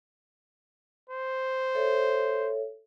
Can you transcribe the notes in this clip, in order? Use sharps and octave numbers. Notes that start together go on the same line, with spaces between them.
C5
A4 C#5 E5